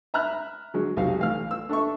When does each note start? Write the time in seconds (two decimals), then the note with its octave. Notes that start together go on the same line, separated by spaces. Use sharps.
0.14 E5 A#5 B5 F6 F#6
0.74 D3 F#3 G#3
0.97 B1 C3 F#4 F5
1.19 A1 F5 F6
1.51 E6
1.69 D4 A4 E5 C#6